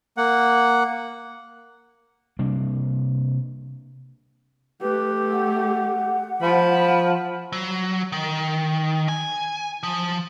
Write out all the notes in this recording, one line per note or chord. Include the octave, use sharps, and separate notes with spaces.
A#3 F#5
C3 G3 A#3 D4
A3 G4 B4
F#5
F3 B5
F#3
D#3
G#5
F3